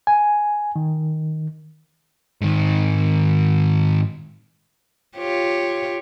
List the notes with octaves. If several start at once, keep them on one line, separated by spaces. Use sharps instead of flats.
G#5
D#3
G#2 D#3
F4 G4 C#5